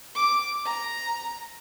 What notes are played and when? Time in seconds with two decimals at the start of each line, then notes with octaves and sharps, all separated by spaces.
0.15 D6
0.65 A#5